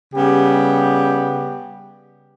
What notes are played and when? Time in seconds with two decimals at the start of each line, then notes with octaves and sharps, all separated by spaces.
0.15 C#3 G3 B3 G4